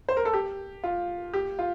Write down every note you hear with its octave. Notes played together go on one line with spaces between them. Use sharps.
C5
A#4
A4
G4
F4
G4
F4